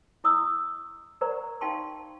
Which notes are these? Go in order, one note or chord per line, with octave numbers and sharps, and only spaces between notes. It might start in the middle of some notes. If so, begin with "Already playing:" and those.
E4 D#5 C#6 D#6 E6
A#4 C5 D5 F#5 A#5 C#6
D#4 F5 G5 A5 C6 C#6